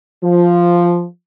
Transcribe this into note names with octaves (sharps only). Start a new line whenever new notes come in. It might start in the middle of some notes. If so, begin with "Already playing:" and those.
F3